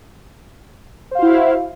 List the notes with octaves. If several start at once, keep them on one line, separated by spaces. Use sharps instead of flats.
E4 F#4 C5 F5